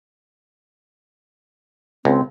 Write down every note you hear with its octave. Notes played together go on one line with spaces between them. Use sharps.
C#2 C4